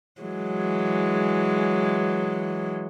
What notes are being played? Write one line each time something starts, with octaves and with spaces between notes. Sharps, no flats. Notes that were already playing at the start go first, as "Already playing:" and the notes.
E3 F#3 G#3